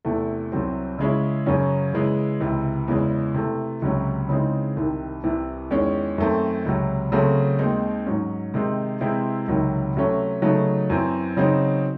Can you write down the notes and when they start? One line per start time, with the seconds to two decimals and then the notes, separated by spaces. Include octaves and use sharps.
0.05 E2 C3 E3 A3
0.52 C2 C3 F#3 C4
0.99 C#3 G#3 C#4 E4
1.46 F#2 C#3 F#3 C#4
1.93 C#3 E3 G#3
2.40 C#2 C3 E3
2.88 E2 C#3 E3 G#3
3.34 C3 E3 A3
3.82 C#2 C3 F#3 C#4
4.29 C#3 E3 G#3 C4 D#4
4.77 C2 C3 D#3
5.24 C2 C3 E3
5.71 E2 D#3 G#3 C#4
6.18 F#2 D#3 A3 C4
6.65 C#2 C3 F#3
7.12 C#3 F#3 A3 C4
7.59 D#2 D#3 G#3 C4 D#4
8.06 G#2 F#3 C#4
8.54 C3 D#3 G#3 C4 D#4
9.01 C3 E3 G#3 C4 E4
9.48 C#2 C3 D#3 F#3
9.96 C3 F#3 A3 C#4
10.42 C#3 F#3 A3 D#4
10.90 F#2 E3 C4
11.37 C#3 F#3 C4 D#4